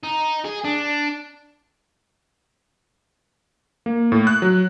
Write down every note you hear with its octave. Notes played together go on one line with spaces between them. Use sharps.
D#4
G#4
D4
A#3
A2
F#6
F#3